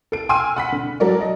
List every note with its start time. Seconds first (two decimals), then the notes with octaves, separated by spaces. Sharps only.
0.12 A4 D7
0.29 G5 G#5 C6 E6 F6 D#7
0.56 F#5 B5 B6
0.72 D3
1.00 F#3 A4 A#4 D5
1.21 D#5